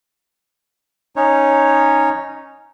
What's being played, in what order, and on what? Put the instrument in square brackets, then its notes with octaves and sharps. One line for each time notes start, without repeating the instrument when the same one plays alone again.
[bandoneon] C#4 D#4 C#5